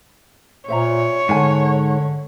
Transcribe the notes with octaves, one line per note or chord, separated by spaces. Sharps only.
A#2 C5 C#5 E5 A#5
G#2 D3 A#4 G#5 A5